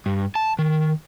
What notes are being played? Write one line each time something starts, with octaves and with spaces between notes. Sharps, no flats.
G2
A5
D#3